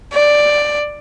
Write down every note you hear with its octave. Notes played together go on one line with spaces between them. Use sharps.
D5